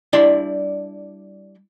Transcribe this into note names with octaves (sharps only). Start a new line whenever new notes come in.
G3 D4 E4 D5 C6